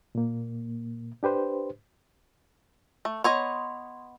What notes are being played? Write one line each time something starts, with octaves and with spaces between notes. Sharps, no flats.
A#2 A#3
D4 G4 B4 C5
A3
B3 C#5 D#5 C6 G#6